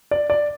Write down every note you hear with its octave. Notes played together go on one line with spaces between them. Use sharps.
D5
D5